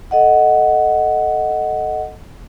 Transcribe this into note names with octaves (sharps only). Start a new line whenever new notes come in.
A4 D#5 F#5